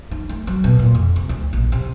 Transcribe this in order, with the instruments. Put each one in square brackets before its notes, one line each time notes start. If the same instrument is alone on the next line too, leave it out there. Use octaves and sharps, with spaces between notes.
[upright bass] D#4
A3
F#3
B2
A#2
F2
C3
D2
A#1
C3